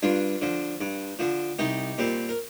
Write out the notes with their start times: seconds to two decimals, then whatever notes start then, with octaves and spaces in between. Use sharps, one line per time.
0.03 G2 D4 F4
0.42 D3 F3
0.81 G2
1.19 D3 F3
1.59 C2 D#4 G4
1.98 A#2 G3 C4
2.29 A#4